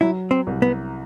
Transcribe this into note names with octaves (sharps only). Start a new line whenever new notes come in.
F#3 E4
C4
C2
B3